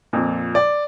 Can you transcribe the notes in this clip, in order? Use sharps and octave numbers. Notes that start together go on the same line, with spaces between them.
F2 A#2
D5